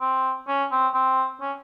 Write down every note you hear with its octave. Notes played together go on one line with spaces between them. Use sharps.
C4
C#4
C4
C4
C#4